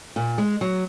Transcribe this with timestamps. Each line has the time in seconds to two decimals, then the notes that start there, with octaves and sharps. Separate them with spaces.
0.16 A#2
0.38 G#3
0.61 F#3